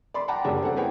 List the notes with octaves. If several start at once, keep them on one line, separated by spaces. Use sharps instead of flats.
D5 B5 C6
F#5 G5 A5 A#5 D6
F#1 F#2 G3 G#3 D4 G#4
C4 A4 F#5
A#3 E4 G#4 B4 C#5 G5